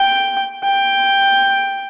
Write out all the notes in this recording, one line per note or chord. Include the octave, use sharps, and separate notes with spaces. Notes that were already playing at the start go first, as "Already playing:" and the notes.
Already playing: G5
G5